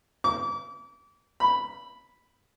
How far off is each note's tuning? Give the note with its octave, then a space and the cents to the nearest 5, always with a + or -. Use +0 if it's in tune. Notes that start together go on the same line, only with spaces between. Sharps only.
D6 -35
B5 +0